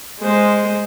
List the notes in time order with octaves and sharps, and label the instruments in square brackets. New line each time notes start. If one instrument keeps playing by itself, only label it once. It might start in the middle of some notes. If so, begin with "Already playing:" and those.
[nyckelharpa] G#3 C5